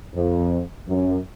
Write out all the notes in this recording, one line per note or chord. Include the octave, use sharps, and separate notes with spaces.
F2
F#2